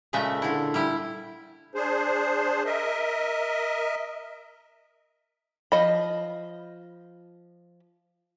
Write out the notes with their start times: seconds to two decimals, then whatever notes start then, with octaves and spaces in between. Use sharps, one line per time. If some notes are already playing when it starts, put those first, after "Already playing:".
0.13 A#2 C#3 G#3 A3 E5
0.42 D3 E4
0.74 G3 E4
1.74 D4 G#4 C5
2.66 A#4 D#5 E5
5.72 F3 D#5 B5